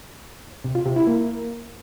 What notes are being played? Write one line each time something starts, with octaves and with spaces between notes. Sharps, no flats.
C3
F4
C3
E4
A#3